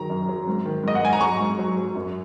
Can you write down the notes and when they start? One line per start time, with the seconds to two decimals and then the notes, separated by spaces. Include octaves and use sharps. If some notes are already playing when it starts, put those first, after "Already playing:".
Already playing: D#3 F#3 A#5
0.10 F#2
0.29 F#3
0.47 G#2
0.65 D#3
0.84 G#2 D#5
0.95 F#5
1.03 G#2 G#5
1.13 A#5
1.21 F#3 C#6
1.39 G#2
1.58 F#3
1.78 F#3
1.95 F#2